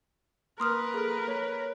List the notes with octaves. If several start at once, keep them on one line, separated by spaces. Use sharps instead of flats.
A#3 A#4 B4 C6 D#6 F6
G#4 A4
C#5